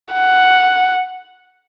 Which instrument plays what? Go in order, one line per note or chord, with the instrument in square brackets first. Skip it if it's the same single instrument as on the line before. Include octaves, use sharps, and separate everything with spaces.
[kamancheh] F#5